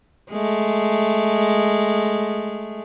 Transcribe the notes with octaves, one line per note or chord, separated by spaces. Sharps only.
G#3 A3